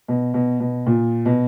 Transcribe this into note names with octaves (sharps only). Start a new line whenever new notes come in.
B2
B2
B2
A#2
B2